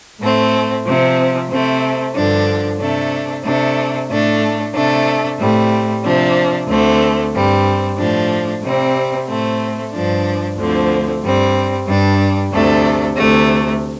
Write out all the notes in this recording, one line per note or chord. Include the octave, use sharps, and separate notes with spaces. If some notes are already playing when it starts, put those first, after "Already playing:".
A2 A3 C4
C3 F3 C4
C3 A3 C4
G2 D3 F3 D4
C3 A3 D4
C3 A3 D4
A2 A3 D4
C3 A3 D4
A2 G3 C4
C3 F3 D4
D2 D3 A3 C4
G2 G3 C4
A2 F3 D4
C3 G3 C4
A2 A3 C4
G2 F3 D4
D2 D3 F3 C4
G2 G3 C4
G2 G3 D4
D2 C3 A3 D4
D2 C3 A3